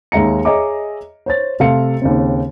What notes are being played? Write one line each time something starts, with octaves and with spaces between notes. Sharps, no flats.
D#2 G#3 E5 A#5 C#7
G#4 C#5 D#5 E5 A#5 D6
C5 C#5 A6
C3 A3 A4 F5 C6 C#7
D#2 C#3 C4